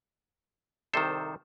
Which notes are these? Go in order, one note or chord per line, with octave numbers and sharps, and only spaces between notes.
C2 C3 D#3 A4 C5